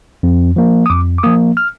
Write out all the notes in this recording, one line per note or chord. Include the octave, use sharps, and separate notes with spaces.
F2
F3 A#3
D#6
F2 D6
D6
F3 A#3 D#6
F6